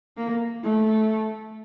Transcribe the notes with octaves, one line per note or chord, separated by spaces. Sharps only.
A#3
A3